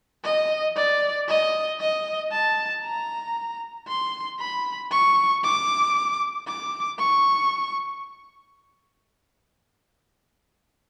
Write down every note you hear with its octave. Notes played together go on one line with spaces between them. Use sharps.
D#5
D5
D#5
D#5
A5
A#5
C6
B5
C#6
D6
D6
C#6